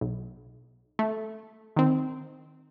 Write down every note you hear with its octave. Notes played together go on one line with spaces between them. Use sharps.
B1
A3
D#3 C4